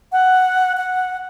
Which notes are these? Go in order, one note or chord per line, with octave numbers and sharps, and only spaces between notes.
F#5
F#5